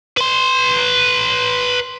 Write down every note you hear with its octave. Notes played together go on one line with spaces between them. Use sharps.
B4 C6